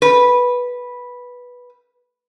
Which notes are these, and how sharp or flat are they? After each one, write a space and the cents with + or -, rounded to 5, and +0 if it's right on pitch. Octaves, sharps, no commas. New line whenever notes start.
B4 -10